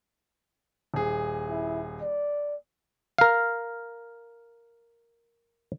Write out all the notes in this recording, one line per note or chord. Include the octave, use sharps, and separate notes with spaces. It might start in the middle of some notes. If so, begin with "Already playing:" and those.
D#1 G#4
E4
D5
A#4 F5